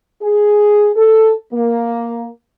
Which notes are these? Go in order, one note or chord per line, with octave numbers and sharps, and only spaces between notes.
G#4
A4
A#3